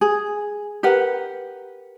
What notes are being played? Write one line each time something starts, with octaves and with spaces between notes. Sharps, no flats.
G#4
G4 A#4 B4 F#5